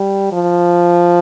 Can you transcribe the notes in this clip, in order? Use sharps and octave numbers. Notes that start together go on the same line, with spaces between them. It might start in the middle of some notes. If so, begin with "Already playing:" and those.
Already playing: G3
F3